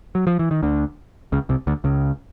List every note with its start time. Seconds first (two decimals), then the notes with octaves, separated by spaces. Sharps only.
0.15 F#3
0.27 F3
0.39 E3
0.51 D#3
0.63 D2 D3
1.32 C#2 C#3
1.49 C2 C3
1.67 D2 D3
1.84 C#2 C#3